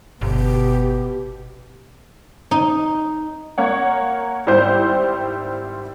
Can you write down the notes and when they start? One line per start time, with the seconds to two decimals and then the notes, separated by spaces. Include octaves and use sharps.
0.21 G1 B2 G4
2.51 D#4
3.58 A#3 C#5 F#5
4.47 G#1 G3 E4 G4 C5 G6